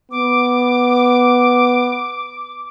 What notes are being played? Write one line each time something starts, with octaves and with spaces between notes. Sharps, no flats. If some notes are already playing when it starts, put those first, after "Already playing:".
B3 D6